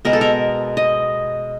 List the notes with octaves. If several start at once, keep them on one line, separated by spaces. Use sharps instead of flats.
B2 G#3 B3 A#4
A4
A#4
D#5